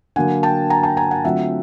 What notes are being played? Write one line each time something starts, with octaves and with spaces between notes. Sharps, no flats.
D3 F#3 A#3 F#5 G#5
G5 A5
G#5 A#5
G5 A5
G#5 A#5
F#5 G#5
D3 F#3 A3 C4 F4 E5 F#5